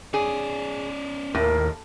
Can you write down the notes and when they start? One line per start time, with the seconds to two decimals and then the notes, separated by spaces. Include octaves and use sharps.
0.14 C#4 G#4 D5
1.35 D#2 A2 A#4